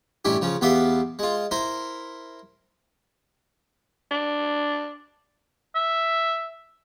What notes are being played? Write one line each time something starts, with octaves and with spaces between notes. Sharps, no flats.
A1 G2 C#4 E4 G4
C#3 F3 C#4
E2 B3 G4 E5 F5 C6
G#3 F4
E4 A#4 C5
D4
E5